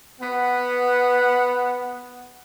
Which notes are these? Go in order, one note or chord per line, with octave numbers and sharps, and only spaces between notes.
B3 F#5